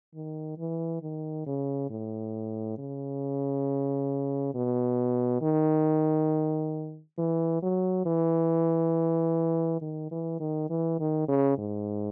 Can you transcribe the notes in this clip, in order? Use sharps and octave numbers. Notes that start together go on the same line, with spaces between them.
D#3
E3
D#3
C#3
A2
C#3
B2
D#3
E3
F#3
E3
D#3
E3
D#3
E3
D#3
C#3
G#2